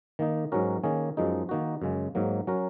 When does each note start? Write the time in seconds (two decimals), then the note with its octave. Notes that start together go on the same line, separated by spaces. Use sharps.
0.19 D#3 A#3 D#4
0.52 G#2 F#3 C#4 F#4 A#4
0.83 D#3 A#3 C#4 G#4
1.17 F#2 F3 G#3 D#4
1.49 D#3 A#3 D#4 F#4
1.82 F#2 C#3 G#3
2.15 G#2 F#3 A#3
2.47 F#3 C#4 F#4 A#4